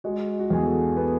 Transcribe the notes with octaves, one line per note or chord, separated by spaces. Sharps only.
G#3 F#4
F#4
E2 G#4
A4
B3